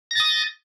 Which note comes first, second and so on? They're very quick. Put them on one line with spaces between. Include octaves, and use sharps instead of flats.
A#6 A6 D#6